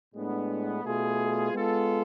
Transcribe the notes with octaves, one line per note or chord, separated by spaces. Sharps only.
A2 G#3 B3 D4
B2 A3 F4 G#4
G#3 B3 F4 A4